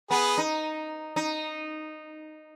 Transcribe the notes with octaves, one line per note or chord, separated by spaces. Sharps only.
B3 G#4 B4
D#4
D#4